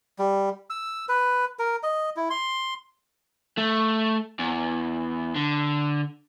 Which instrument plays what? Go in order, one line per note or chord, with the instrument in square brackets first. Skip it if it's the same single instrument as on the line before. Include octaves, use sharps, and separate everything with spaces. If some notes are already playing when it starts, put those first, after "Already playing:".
[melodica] G3
E6
B4
A#4
D#5
E4
C6
[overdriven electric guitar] A3
E2
D3